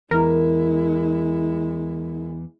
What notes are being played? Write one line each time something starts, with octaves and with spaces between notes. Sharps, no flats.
E2 G#3 E4 A#4